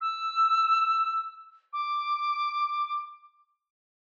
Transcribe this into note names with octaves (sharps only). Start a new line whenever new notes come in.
E6
D6